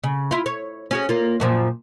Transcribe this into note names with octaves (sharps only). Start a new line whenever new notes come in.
C#3
E4 F4
C#5
C#4 F#4 G#4
A#3 F4
F#2 A#2 F3